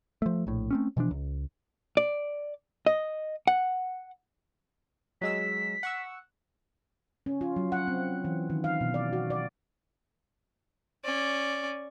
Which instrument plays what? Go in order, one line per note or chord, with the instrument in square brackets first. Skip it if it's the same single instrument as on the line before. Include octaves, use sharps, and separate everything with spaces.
[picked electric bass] F3 A3
A#1 A2
A3 C4 C#4
B2 E3 F3 D4
C#2
[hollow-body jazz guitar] D5
D#5
F#5
[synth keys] F#3 G#3 E6 [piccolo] B6
[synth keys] F#5 C#6 E6
[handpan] C#4
F4
F#3
F#5
C4
E3
D#3
F5
B2
D5
F#4
D5
[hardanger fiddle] C#4 D5